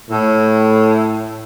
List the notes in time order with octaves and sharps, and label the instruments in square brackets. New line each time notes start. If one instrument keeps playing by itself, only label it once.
[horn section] A2